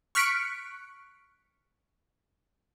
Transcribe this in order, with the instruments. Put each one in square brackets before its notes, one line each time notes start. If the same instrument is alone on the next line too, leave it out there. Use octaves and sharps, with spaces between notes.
[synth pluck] C#6 F6 F#6 B6 C#7 D7